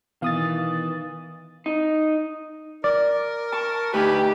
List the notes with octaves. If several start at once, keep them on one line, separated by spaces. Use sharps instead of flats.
B2 D#3 E3 F5 D#6 A6
D#4
A#4 D5
A5 C#6
D2 D#4 G4 B4 G#5